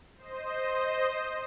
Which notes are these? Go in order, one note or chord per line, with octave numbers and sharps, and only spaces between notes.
C5 D#5